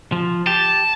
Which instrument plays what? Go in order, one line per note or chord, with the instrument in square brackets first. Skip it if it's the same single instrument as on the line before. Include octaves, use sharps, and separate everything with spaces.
[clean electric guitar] F3
[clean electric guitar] G4 [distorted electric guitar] A5